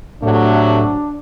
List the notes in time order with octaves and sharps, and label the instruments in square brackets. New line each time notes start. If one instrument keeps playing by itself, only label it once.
[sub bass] A2 [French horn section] C3 F#3 A3 [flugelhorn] D4